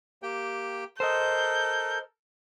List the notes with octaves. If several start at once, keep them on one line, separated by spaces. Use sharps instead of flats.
A#3 G4 G5
A4 A#4 C5 D#5 G6